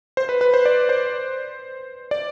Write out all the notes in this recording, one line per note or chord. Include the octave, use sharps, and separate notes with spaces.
C5
B4
B4
C5
D5
C5
D5